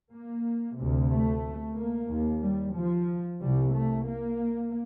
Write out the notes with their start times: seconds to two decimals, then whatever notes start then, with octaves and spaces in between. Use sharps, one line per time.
0.11 A#3
0.77 D2 C3
1.09 A3
1.75 A#3
2.09 D#2
2.41 G3
2.74 F3
3.39 C2 C3 G3
3.73 A3
4.06 A#3